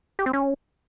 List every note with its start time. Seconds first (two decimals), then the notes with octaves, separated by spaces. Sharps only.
0.19 G4
0.26 C4
0.33 C#4